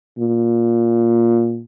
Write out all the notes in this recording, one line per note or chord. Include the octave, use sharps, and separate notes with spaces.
A#2